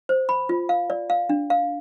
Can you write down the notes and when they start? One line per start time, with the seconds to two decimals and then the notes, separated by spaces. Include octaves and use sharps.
0.09 C5
0.29 B5
0.49 F4
0.69 F5
0.90 D5
1.10 F5
1.29 D4
1.50 F5